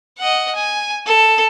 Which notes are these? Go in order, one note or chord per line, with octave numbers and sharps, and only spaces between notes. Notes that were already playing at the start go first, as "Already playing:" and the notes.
D#5 F#5
G#5
A4